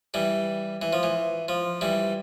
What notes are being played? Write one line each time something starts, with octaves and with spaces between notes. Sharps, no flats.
E3 G3
E3
F3
E3
F3
E3 G3